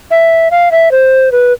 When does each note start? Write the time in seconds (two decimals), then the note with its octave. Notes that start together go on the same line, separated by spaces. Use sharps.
0.11 E5
0.51 F5
0.72 E5
0.91 C5
1.32 B4